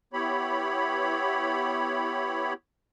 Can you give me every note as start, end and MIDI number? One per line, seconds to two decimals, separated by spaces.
0.13 2.53 59
0.13 2.53 64
0.13 2.53 67
0.13 2.53 73
0.13 2.53 83